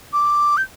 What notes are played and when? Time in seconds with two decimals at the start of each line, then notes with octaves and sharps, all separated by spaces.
0.13 D6
0.57 G6